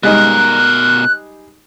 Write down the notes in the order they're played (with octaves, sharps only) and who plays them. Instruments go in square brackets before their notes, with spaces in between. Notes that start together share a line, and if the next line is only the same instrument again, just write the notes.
[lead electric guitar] B2 A#4 [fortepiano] G3 G#3 D#4 [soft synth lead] F#6